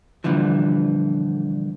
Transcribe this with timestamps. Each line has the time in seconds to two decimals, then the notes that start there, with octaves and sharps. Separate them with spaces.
0.24 G2 A#2 D3 E3 F3